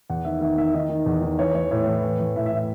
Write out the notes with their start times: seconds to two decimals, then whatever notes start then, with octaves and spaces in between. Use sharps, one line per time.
0.10 E2 F#5
0.25 D#3 E5
0.41 D#3 E5
0.58 D#3 E5
0.74 D#3 D#5
0.89 D#3
1.06 E2
1.22 D#3
1.39 E3 C#5
1.54 E3 C#5
1.71 A2 C#5
1.87 E3
2.04 E3
2.19 E3
2.36 A2 E5
2.46 E5
2.52 A2
2.57 E5